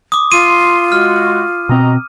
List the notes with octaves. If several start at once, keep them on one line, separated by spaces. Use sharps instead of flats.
D6 D#6
F4 C6 D#7
G#3 F#4 F6
B2 C4 F#4 D#5 A#5